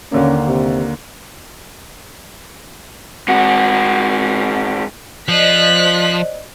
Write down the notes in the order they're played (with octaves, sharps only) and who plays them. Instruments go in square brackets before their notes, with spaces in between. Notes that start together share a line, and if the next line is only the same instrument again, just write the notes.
[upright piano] D#2 D3 A#3 [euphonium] C#4
[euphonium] C3
[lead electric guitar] G#2 F#4
[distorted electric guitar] F3 [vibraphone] C5 D5 D#5 [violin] F#6 B6